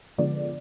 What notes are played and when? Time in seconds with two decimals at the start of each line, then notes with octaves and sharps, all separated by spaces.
0.18 D3 F3 G#3 B3 D5